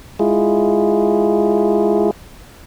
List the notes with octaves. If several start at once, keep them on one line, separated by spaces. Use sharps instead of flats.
G#3 E4 F4 G#4